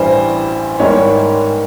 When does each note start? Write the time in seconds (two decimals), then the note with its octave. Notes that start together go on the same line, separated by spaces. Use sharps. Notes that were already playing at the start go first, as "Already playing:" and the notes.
Already playing: A1 G2 E3 G3 C5
0.80 G#2 D#3 G3 A#3 C#5